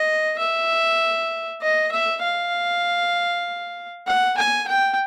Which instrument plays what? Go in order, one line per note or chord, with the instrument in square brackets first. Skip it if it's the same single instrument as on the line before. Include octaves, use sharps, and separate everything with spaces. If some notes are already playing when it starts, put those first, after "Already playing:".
Already playing: [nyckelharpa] D#5
E5
D#5
E5
F5
F#5
G#5
G5